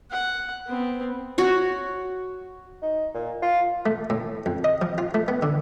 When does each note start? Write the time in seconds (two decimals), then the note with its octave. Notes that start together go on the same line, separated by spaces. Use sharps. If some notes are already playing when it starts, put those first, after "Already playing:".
0.11 F#5
0.68 B3 C4
1.38 F#4 C#5
2.82 D#4
3.14 A#2
3.42 F4
3.86 A3
4.10 A2
4.46 F2
4.64 D#5
4.82 F3
4.98 F4
5.14 A3
5.28 B3
5.43 D3